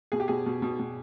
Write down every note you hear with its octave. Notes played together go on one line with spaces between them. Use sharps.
B2 G#4
G4
B2 G#4
B2
B2
B2